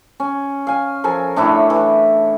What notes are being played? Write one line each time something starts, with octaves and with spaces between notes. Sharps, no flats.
C#4
F5 G#5
F3 A4 A#4 G#5
A2 D4 E4 C#5
E3